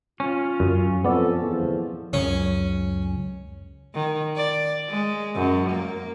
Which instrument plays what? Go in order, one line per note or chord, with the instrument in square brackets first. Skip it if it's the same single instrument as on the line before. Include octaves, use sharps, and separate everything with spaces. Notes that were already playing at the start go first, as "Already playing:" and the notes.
[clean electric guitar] C#4 [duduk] F4
[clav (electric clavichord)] F#2
[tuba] F2 [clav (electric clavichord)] B3 D5 [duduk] A4
[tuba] E2 [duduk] F3
[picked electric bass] C#2 F#2 C#3 [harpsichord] C#4
[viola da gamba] D#3
D5
G#3
F#2
A#3